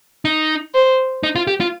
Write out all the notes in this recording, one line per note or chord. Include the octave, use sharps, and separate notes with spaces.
D#4
C5
D#4
F4
G4
F4